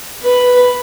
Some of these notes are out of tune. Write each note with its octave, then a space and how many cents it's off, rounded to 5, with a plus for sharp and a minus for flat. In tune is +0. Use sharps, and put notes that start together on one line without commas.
B4 +0 B5 +0